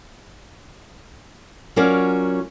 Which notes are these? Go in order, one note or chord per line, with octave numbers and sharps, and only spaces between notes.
F#3 C#4 F4 A#4 D5